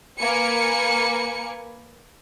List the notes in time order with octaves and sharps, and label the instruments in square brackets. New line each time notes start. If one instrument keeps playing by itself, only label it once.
[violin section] A#3 B4 G#5 C#7